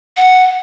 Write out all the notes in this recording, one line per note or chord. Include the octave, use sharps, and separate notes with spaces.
F#5